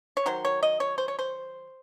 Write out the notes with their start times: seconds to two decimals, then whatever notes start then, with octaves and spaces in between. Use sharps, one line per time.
0.17 C#5
0.26 D#3 F#3 C5
0.45 C#5
0.63 D#5
0.80 C#5
0.98 C5
1.08 C#5
1.19 C5